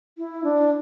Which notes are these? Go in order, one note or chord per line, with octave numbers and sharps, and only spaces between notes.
E4
D4